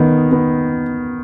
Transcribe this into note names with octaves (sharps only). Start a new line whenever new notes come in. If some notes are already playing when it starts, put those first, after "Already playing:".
Already playing: D#3 B3
B3